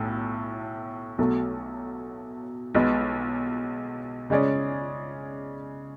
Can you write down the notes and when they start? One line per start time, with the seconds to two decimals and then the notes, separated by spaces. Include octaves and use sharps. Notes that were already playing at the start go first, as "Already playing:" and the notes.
Already playing: B1 A2
1.18 B1 B2 F#3 A3
2.75 B1 B2 G#3 B3
4.30 C#3 G#3 C#4 G#4 D5